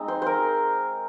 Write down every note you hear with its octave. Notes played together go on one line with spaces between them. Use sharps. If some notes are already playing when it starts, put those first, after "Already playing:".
Already playing: G#3 C4 D#4
C5
A#4 C5